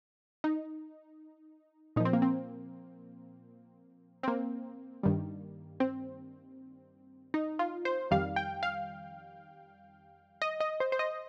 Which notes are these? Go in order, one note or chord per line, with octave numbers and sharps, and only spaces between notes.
D#4
A#2 F3 D#4
C4
A#3
C4
C4
A#3
G2 D#3 G3
C4
D#4
F4
C5
F2 D#3 G3 F5
G5
F5
D#5
D#5
C5
C5
D#5